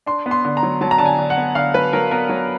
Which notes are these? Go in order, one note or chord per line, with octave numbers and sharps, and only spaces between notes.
D4 C6
B3
C6
D3
A#5
F#3
F#3 A5
A#5
D3 A5
G#5
D3
F#5
B3
D3 F5
F#3 B4
F#3 A#4
B3 A#4
F#3